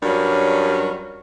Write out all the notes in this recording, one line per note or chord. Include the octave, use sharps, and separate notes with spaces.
G2 F#3 C#4 A#4 D5